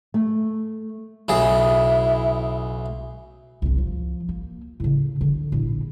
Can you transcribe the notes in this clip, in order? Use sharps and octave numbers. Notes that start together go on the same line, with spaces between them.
A3
B1 C#3 E4 G#4
C2 G2
F3
A#3
A2 C#3
D3
A#1 E4